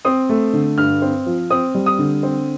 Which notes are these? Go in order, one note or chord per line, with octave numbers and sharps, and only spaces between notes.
C4 D#6
A3
D3
G2 F6
C4
F3
C4 D#6
G3
D#6
D3
C4